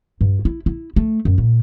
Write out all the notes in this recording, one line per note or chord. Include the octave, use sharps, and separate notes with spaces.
G2
E4
E4
A3
F#2
A#2